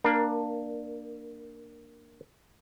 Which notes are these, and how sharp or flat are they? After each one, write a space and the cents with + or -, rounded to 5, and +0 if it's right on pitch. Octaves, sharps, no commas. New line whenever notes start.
A#3 +0 D4 +15 A#4 +20